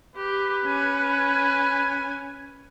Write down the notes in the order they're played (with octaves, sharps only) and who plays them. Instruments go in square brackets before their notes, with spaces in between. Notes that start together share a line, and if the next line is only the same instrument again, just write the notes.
[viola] G4 [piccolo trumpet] B4
[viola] C#4 G#5